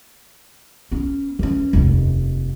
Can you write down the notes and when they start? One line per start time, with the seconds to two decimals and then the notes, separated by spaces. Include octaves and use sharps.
0.92 B3 C#4
1.39 E3 C#4
1.73 F1 D#2